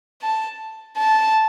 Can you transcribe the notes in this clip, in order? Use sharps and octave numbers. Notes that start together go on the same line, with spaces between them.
A5
A5